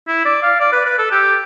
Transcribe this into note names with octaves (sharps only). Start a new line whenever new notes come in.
E4
D5
F5
D5
B4
B4
A4
G4